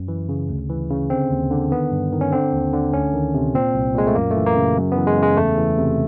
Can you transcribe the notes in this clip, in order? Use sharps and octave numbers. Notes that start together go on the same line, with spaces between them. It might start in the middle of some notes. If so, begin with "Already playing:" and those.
Already playing: F#2
E3
C#3
D2
E3
C#3
D3 C4
D#2
D3
D#3 B3
G2
D#3
C#4
D3 C4
D#2
D3
D2 C#4
D#3
C3
A#2 C4
C2
A#2 G#3
A3
F#2 A#3
A3
E3
A#3
C#3
F#2
B3
E3
G#3
C#3
G#3
E2 A3
E3
C3